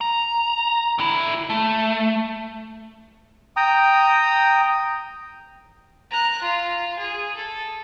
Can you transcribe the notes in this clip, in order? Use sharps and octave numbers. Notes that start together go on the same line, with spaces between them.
A#5
D3 E4
A3
G5 A#5 D#6
A#5 F#6
F4
G#4
A4